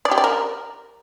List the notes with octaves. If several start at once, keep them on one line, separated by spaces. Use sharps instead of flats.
D5
G4
D5
A#4